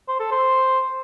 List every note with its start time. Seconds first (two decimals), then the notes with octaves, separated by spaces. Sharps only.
0.09 C5
0.20 A4
0.32 C5